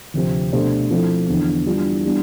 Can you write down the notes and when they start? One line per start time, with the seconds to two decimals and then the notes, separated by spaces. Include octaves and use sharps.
0.14 D2 C3 F3 C4
0.52 B2 A3 D4 G4 C5
0.91 F3 C4 E4 A4
1.28 E2 D3 F3 B3
1.65 E3 G3 D4 F4
2.04 E3 G3 B3 D4